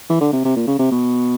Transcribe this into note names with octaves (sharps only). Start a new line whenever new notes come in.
E3
D3
C3
C3
A#2
C#3
C3
B2